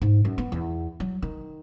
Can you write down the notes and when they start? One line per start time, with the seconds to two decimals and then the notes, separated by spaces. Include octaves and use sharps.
0.02 G#2
0.25 F#2
0.38 B3
0.52 E2
1.00 F#3
1.22 D#3